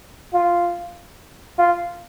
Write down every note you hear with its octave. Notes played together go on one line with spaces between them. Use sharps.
F4
F4